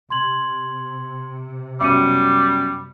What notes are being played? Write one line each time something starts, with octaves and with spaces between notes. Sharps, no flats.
C3 C6 G#6 F#7
F#2 G3 B3 D6 C#7 D#7